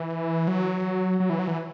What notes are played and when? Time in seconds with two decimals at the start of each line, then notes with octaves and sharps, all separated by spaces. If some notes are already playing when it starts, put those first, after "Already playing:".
Already playing: E3
0.48 F#3
1.20 F#3
1.30 E3
1.39 F#3
1.48 E3